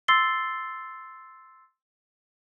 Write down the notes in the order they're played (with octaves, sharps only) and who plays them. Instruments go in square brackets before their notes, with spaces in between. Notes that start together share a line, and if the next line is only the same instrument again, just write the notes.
[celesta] C6 E6 A6 C7 G7